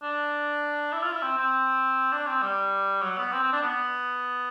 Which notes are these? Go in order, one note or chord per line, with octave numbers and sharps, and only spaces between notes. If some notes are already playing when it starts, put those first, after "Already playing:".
D4
E4
F4
E4
C4
C4
D4
C4
G3
F#3
B3
C4
C4
D4
B3